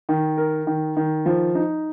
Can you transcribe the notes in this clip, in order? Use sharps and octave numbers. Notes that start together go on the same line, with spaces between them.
D#3
A#4
D#3
D#3
F3
D#4